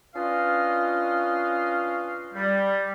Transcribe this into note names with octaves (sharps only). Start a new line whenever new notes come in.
C#4 D4 F4 B4 D#5 F5
G3